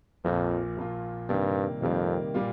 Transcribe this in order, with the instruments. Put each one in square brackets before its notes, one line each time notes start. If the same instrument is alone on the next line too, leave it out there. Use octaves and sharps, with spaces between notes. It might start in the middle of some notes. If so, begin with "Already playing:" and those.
[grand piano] A#1 A#2 A#3 F4 [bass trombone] F2
[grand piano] A#1 A#2 A#3 F4
[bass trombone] G2 [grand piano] C3 D#3 G3 A#3
[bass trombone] F2 [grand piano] C3 D#3 G3 A#3
[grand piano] A#2 G3 A#3 F4